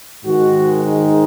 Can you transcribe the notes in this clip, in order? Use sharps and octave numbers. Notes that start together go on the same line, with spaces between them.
G#2 D#3 G#3 F#4
D#4